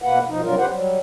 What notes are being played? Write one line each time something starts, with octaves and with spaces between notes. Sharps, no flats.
B2 A#3 B4 F#5
B2 F3 D#4
G2 C3 F#3 G3 F4 A#4
G4 B4 C5 F#5
F#3 G3